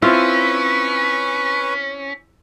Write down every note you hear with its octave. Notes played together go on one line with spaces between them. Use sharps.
C4 C#4 E4 F4 B4 C#6